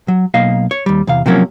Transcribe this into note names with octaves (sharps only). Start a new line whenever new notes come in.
F#3
B1 A#3 D#5 F5
C#5
D#2 G3
E2 C3 F5
C3 F3 F#3 A#3 C#4